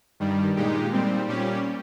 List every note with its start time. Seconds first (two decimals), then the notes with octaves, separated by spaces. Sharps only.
0.20 G2 D#3 G3
0.56 A#2 G#3 D#4 G4
0.93 A#2 G3 C4
1.28 A#2 G3 C#4 G4